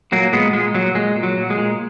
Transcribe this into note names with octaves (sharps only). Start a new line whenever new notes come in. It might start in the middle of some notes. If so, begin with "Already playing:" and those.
A#2 F#3 A#3
A#2 G#3 B3
A#2 G#3
A#2 F#3
A#2 G#3
A#2
F#3
A#2
G#3
A#2